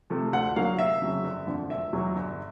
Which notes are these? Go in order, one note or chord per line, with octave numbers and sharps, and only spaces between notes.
C3 F3 A3
D2 F#5
D3 F#3 A#3 F5
F1 E5
F2 C#3 F#3
G1
F2 D3 F3
E1 E5
E2 B2 F#3
G1